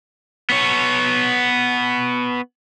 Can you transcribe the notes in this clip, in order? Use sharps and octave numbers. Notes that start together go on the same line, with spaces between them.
B3 C#5